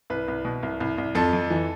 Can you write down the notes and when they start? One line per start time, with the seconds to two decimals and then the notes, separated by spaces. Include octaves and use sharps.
0.10 C2 B4
0.28 C2
0.45 B2
0.63 C2
0.80 C2
0.98 C2
1.15 F2 A4
1.33 F2
1.50 E3